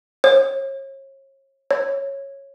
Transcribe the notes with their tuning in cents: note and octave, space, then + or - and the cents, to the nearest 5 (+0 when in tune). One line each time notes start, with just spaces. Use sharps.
C#5 -35
C#5 -10